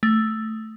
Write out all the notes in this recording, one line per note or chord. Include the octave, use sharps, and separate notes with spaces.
A3